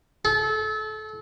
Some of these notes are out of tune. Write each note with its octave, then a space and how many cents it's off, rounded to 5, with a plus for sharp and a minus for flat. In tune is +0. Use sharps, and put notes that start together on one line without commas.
A4 -30